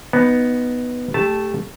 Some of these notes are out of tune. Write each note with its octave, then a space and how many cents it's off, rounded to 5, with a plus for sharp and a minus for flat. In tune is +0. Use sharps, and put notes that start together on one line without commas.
B3 +0 D#4 +0
A3 +0 G4 +20 A5 -5